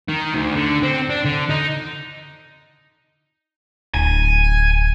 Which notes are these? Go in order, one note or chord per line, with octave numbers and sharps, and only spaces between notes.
D#3
D2
D3
C4
D4
D3
D#4
D1 G#5